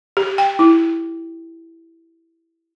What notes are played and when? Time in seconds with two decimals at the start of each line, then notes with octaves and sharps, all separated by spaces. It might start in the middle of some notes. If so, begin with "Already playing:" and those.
0.17 G4
0.38 G5
0.59 E4